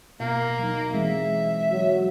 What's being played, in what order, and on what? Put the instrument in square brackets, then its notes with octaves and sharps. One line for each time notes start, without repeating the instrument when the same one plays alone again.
[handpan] B2 F5 [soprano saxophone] A#3
[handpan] F#3 D#4
[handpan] E3 G#3 C4 [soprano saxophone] E5
[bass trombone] F#3